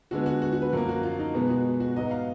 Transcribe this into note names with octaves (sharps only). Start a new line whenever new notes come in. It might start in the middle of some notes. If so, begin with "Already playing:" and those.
D3 G#3 B3 F#4
F#4
F#4
F#4
B4
F#2 F3 A#3 A#4
F#4
F4
D#4
B2 G#3 B3
F#4
F#4
G#2 F#3 B3 D#5
F5